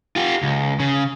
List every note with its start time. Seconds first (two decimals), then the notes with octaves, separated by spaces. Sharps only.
0.16 F4 G4
0.43 C#2
0.80 C#3